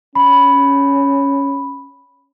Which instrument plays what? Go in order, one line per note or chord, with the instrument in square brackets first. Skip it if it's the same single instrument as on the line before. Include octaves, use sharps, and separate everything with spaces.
[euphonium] C#4 [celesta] B5